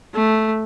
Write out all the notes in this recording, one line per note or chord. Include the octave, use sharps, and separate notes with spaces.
A3